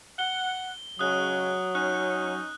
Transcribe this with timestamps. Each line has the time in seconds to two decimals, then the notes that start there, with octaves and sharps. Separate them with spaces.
0.19 F#5 G7
0.99 C#3 F#3 G#3 C#4 D#6 F#6
1.75 C#4 D#4 F#6